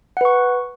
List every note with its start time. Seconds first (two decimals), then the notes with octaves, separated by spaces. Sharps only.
0.17 F#5
0.21 B4
0.25 C#6